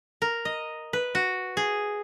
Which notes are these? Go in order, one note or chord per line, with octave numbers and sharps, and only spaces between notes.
A#4
D#5
B4
F#4
G#4